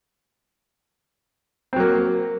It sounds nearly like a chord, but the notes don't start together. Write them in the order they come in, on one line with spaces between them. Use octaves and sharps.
C4 F#3 A#3